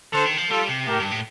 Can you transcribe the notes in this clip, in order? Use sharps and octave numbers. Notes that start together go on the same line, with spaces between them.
D3 A4 C5
D#3
F3
G3 F4 A4
C3
A2 G4 A#4
G2
A2